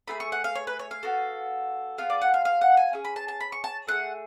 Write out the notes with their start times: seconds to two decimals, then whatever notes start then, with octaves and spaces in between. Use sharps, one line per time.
0.08 A3 F4 G#4 B5
0.20 C#6
0.32 F#5
0.44 F5
0.55 C#5
0.67 B4
0.79 C#5
0.91 F5
1.03 B3 F#4 A4
1.98 B3 F4 G#4 F5
2.10 D5
2.22 F#5
2.34 F5
2.45 F5
2.61 F#5
2.77 G#5
2.93 C#4 G#4
3.05 B5
3.16 A5
3.28 A5
3.40 B5
3.52 C#6
3.64 A5
3.87 A3 F4 G#4 F#5